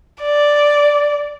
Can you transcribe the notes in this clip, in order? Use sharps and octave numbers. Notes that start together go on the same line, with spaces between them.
D5